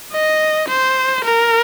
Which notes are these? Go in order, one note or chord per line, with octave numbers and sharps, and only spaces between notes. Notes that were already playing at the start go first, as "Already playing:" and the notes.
D#5
C5
A#4